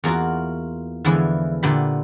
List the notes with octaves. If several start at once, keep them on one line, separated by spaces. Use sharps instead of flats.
E2 A#3 F4 F#4 A#4
E2 D3 E3 F3 G#3 E4
A#2 D3 B3 G4 B5